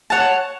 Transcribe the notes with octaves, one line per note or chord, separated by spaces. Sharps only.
C#5 F#5 A5